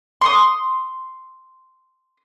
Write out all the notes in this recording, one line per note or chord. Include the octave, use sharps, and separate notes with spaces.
C6 C#6 D#6